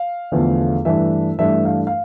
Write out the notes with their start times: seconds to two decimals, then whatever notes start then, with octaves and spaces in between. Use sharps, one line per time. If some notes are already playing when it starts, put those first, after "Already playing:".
Already playing: F5
0.32 E2 D3 F3 A3
0.85 G2 E3 A3 D4 E5
1.39 G2 E3 A3 D4 E5
1.65 F5
1.87 F5